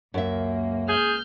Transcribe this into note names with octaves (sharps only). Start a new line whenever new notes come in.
C#2 F#2 A#3 E5
G#4 F6 G6